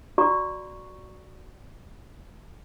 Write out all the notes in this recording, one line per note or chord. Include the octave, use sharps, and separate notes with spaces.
F#4 D5 A#5 C#6